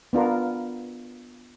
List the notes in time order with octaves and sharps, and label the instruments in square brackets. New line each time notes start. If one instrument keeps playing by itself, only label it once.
[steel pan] B3 D4 F4 A#4